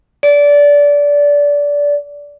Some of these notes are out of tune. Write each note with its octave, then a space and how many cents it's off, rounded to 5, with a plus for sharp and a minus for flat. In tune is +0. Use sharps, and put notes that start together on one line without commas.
D5 -20